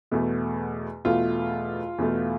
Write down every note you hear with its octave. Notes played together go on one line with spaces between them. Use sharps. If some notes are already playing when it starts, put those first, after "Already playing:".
E2 B2 A3
E2 B2 A3 F4
E2 B2 A3